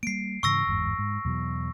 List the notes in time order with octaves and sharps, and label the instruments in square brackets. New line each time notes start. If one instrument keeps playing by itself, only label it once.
[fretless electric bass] G3 A#3 [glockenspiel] C7 D7
[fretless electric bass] G#2 C#3 E3 [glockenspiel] C#6 E6 A#6
[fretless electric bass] G1 E2 G#2
G#2
E2 B2 F#3